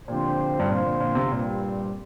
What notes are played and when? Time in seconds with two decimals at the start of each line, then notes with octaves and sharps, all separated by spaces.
0.08 A#2 D3 F3 C4 G4 C5
0.59 G2
0.69 A#2 D3 F3 C4 F4 C5
0.85 A#2
1.00 A#2
1.15 C3
1.31 G2 A#2 G3 C4